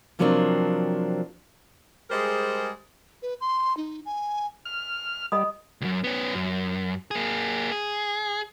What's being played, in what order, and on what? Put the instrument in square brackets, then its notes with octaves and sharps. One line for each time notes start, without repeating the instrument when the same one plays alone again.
[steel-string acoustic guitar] C3 F3 F#3 A#3 C4 D4
[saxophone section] G3 G#3 G#4 A#4 C5
[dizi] B4
C6
D#4
G#5
[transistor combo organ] F6
[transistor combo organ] G3 [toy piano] D#5 B5 D#6
[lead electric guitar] C#2 F#2
B3 C#4
F#2
A#3 G#4
G#4